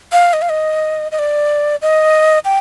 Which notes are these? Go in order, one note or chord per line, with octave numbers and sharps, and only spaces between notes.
F5
D#5
F5
D#5
D#5
D5
D#5
G5